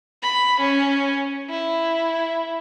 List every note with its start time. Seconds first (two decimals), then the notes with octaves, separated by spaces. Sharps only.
0.22 B5
0.60 C#4
1.50 E4